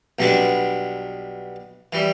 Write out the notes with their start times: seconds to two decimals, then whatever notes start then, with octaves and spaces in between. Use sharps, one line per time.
0.19 B1 B2 G3 B3 D4
1.93 E3 G3